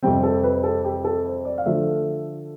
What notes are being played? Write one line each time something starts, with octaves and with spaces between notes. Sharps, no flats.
F2 C3 G3 C4 G5
A4
B4
A4
G4
A4
C5
D5
F5
D3 F3 A3 E5